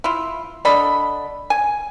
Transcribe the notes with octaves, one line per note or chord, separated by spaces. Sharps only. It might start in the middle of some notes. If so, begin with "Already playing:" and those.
E4 F4
D3 D5 D#5 B5
G#5